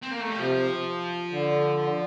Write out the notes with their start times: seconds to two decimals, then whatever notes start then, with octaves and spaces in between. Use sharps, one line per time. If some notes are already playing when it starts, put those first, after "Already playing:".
0.02 C4
0.11 A#3
0.20 A3
0.29 G3
0.38 C3 F3
1.31 D3